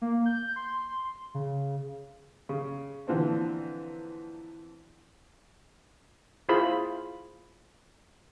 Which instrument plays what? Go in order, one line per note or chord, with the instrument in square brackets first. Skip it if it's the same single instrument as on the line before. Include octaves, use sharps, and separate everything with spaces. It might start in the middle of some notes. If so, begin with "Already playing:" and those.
[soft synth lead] A#3
G6
C6
C#3
[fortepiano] C#3
A#2 D3 E3 F3 C4 D4
[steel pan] E4 F4 G#4 C5 B5